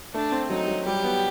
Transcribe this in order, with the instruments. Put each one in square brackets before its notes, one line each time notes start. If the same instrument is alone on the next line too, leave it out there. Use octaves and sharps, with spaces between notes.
[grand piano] A3 [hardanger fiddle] D4
[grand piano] C4
[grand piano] F#3 [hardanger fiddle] D#4
[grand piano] F#3
[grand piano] G3 [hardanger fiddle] G4
[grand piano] B3